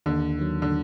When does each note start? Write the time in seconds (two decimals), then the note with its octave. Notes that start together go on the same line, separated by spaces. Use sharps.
0.06 D#2 D3
0.39 D#3 F#3
0.62 D3